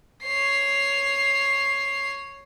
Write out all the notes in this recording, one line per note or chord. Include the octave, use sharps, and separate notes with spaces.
C#5 C7